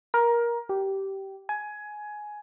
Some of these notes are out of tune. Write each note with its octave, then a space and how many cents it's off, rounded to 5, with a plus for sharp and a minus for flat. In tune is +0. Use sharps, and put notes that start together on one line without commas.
A#4 +20
G4 -15
G#5 +15